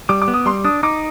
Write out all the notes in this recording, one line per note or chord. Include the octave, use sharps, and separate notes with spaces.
G3 D6
D6
B3
D#6
G3 C6
D4 D#6
D#4 D6